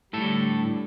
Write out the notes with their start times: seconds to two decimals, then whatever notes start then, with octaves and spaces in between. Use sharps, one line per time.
0.14 A2 D3 G3 A4